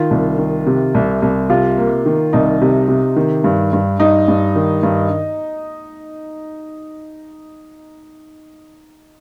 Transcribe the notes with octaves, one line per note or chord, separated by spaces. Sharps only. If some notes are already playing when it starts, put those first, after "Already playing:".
Already playing: D#3 F4
C2
D#3
C3
C2
C2
C3 F4
A#3
D#3
C2 D#4
C3
C3
D#3
G2
G2
G2 D#4
G2
D#3
G2